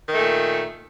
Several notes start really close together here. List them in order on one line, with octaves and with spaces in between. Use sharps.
D#3 A3 A#2